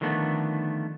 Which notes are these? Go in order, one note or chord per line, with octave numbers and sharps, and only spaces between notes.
D3 D#3 F3 A3 B3